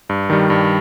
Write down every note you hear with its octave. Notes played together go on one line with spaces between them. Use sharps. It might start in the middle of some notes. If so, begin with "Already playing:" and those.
G2
D#3 G3
G2